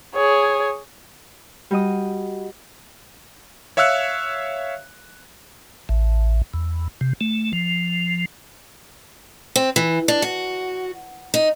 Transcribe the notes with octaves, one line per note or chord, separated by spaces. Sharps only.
G#4 C#5
G3 F#4 D#5 D#6
C#5 E5 F5 E6 F#6 C#7
A1
E2
C3
A3
F3
C4
E3
D4
F#4
D#4